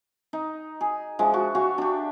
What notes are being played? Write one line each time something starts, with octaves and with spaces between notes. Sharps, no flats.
D#4
G#4
F3 G#3 D4 E5
F#4
F#4 G#4 E5 F5
D4 G4